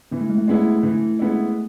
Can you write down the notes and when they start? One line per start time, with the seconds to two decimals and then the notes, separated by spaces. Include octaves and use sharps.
0.12 E3 B3
0.21 A3
0.30 G#3
0.38 A3
0.47 G#3 B3 E4
0.83 E3
1.19 G#3 B3 E4